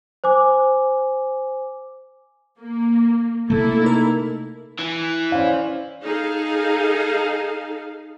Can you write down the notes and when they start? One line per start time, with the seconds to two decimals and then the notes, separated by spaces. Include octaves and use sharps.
0.24 C5 G#5 D6
2.59 A#3
3.50 C3 A3 A#3 E4 A4
3.82 D#4 A#4
4.79 E3
5.32 C#4 C5 D5 F5
6.04 D#4 G#4 A4 F5